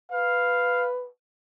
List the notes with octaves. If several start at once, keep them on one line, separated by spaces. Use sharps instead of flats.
B4 F5